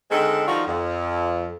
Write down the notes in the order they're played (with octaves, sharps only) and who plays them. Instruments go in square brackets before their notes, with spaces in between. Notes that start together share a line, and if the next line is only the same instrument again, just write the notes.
[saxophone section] D3 D#3 G#3 C4 A4
D#3 F3 G3 D#4 F4 F#4
F2